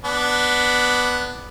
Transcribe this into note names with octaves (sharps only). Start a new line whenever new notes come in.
B3 D4